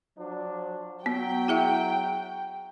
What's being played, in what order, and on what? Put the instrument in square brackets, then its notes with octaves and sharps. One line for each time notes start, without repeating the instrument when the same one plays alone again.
[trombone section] F3 F#3 D4
[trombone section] F#3 [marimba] B3 [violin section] G5
[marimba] E4 G#4 E5